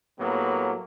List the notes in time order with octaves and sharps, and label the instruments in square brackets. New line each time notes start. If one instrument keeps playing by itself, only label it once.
[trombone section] A2 F#3 G3 A#3 B3